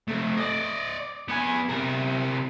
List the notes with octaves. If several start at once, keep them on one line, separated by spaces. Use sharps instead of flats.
A3 C4
D5 D#5
B3 G#5
C3 A#4